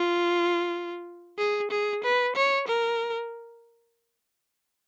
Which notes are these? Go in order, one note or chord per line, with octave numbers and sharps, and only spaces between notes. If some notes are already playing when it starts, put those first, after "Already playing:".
Already playing: F4
G#4
G#4
B4
C#5
A#4